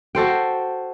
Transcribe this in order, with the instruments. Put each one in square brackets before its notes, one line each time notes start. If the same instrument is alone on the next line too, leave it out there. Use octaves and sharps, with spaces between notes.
[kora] F#4 A4 C5 G5